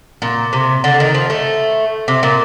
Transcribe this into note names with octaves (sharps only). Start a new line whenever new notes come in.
A#2
C3
D3
D#3
F3
A3
C3
A#2